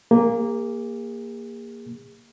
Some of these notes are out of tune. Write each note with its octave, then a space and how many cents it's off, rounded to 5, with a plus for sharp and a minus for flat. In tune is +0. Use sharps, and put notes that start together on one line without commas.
A#3 +0 G#4 -40